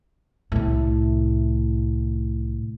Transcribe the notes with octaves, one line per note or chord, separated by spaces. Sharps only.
C2 A2